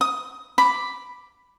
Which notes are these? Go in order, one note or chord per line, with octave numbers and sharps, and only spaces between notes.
D#6
B5 D6